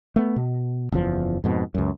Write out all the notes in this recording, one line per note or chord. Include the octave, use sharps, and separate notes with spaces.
A3 B3
B2
F#1 E2 F3
F2 G#2 B2
C#2 F#2